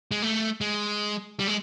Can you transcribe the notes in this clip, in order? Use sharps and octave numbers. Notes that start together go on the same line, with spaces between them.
G#3
A3
G#3
G3
G#3